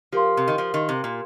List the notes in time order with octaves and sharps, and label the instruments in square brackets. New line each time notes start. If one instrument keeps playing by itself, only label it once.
[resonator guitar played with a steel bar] F3 [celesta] G4 A#4 F5 C6
[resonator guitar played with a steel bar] C3
D#3
F3
D#3
C3
A#2